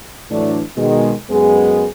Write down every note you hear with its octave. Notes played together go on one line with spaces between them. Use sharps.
A2 E3 F#3 A3 D4
B2 D#3 G#3
F#2 G#3 B3 G#4